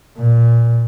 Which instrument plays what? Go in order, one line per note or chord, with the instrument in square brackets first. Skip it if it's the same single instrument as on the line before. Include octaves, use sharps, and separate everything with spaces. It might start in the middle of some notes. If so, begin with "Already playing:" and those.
[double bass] A#2